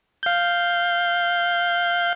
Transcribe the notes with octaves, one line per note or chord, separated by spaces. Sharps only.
F5 G6